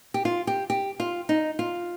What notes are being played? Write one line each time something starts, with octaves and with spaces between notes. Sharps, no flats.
G4
F4
G4
G4
F4
D#4
F4